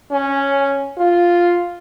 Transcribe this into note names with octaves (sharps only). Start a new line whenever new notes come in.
C#4
F4